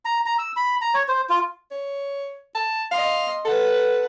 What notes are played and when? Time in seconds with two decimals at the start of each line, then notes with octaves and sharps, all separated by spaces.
0.05 A#5
0.26 A#5
0.39 E6
0.57 B5
0.82 A#5
0.94 C#5
1.08 C5
1.29 F4
1.71 C#5
2.55 A5
2.92 D#5 F5 C6
3.45 A4 B4 F#5